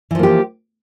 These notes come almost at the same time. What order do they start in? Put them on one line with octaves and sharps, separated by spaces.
E3 F3 A#3 G4